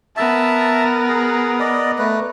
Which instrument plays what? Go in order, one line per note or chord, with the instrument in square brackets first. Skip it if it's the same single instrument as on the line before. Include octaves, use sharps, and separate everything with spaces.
[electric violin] B3 A#4 [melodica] E5 A5
[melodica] G#4
D5 D#5
A3 B4